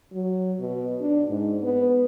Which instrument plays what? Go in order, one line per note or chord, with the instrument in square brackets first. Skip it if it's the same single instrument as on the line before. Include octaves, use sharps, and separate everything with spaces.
[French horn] F#3
B2
D4
G#2
B3